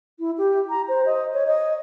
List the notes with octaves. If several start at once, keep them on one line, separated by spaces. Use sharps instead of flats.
E4
G4
A#5
C5
D#5
C#5
D#5